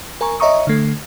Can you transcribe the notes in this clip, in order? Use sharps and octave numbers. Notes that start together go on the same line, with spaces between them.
A#4 G#5 A#5 C#6
C#5 D#5 E5 A#5 C#6 D#6
D3 A3